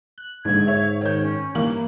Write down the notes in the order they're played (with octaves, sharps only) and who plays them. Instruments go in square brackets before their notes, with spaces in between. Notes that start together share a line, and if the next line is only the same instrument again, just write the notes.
[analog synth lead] F#6
[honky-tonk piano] A#1 D3 [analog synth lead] G#2 [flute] G#6
[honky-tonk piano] C#5 E5
[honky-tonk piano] D#3 G6 [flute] C#5
[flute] C#4
[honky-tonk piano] G2 E3 F#7 [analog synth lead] A#3